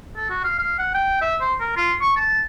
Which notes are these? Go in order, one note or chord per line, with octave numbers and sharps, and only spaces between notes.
A4
F#4
F5
F5
F#5
G5
E5
C5
A#4
F4
C#6
A5